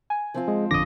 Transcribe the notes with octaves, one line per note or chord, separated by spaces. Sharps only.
G#5
F3 C4 F4
G#3
G1 F2 D3 D6 D#6 A#6